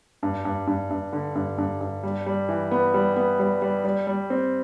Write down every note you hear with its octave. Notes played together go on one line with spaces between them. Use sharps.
G2
G2
G2
G2
D3
G2
G2
G2
G3
G3
E3
B3
G3
B3
G3
G3
G3
G3
C4